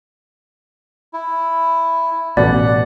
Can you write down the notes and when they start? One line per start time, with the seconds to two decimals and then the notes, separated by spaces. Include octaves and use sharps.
1.13 E4
2.37 A1 B2 D5 F#5